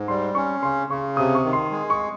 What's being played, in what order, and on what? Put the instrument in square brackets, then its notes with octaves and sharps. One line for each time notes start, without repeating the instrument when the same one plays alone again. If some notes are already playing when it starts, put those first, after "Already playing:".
Already playing: [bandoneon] G#2
[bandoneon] G3 [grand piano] C6
[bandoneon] C#4 [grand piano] C#6
[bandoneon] C#3 [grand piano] C6
[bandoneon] C#3 [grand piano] C#6
[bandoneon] C3 [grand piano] D#6
[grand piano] C#6
[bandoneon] D#3
[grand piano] C6
[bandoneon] G#3
[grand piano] C#6